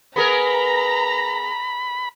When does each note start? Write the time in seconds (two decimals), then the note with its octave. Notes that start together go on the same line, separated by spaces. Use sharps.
0.16 B3 G#4 A#4 A#5 B5